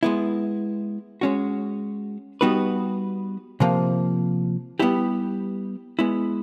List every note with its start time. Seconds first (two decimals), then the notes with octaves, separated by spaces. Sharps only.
0.03 G#3 B3 E4
1.21 G#3 C#4 F#4
2.41 G3 B3 D#4 F#4 B4
3.60 C3 F3 A#3
4.79 G3 B3 E4 G4
5.99 G#3 B3 E4